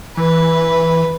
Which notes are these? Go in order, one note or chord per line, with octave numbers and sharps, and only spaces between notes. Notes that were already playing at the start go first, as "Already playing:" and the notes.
E3 B4